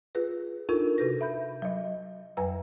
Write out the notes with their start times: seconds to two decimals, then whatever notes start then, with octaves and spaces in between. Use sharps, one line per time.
0.15 F4 G#4 B4
0.69 D4 D#4 F4 A4 A#4
0.98 C3 F#4 A4 B4 A#6
1.21 E5 B5 G6
1.62 F#3 D#5
2.37 F2 F#3 B4 G#5 A#5 E6